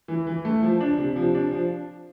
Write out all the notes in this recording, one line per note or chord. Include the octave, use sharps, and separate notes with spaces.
E3
E3
A3
F3
D4
C3
F3
D4
F3